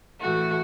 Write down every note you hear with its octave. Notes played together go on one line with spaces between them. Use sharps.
A2 E3 A3 F#4